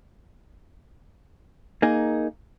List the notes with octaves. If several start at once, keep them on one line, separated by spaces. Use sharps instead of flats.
A#3 D#4 G#4